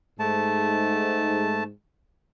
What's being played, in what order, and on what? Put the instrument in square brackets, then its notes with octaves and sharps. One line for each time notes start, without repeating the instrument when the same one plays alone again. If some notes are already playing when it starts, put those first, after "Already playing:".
[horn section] G#2 [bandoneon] A3 A5